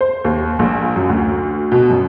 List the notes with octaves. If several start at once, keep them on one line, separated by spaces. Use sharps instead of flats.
C5
D#2
A#1
F#2
D2
B2
F#2